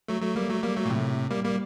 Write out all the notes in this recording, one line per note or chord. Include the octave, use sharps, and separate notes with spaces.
F#3 A3
F#3 A3
G3 A#3
F#3 A3
G3 A#3
F#3 A3
A#2
A2 C3
G3 A#3
G3 A#3